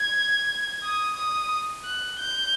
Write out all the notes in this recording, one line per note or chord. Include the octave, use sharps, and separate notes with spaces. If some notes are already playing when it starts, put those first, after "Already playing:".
Already playing: G#6
D#6
D#6
F#6
G6